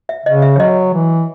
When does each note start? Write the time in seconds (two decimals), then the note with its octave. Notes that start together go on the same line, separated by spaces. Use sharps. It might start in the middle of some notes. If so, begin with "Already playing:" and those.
0.09 E5
0.26 C#3 D#5
0.42 E5
0.56 C#5
0.59 F#3 D#5
0.94 E3